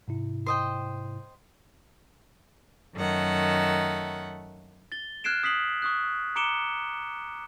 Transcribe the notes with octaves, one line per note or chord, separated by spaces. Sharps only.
G#2 C3 E4
C5 D#5 G5
F#2 D#3 A3 F#5
A6 G7
F6 F#6 G#6 C7 D7 E7
D#6 B6 C7 F#7
C#6 D#6 F#6
A#5 D6 C#7 D7 E7 G7